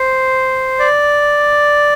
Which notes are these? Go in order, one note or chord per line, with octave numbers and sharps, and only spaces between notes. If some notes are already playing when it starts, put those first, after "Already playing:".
Already playing: C5
D5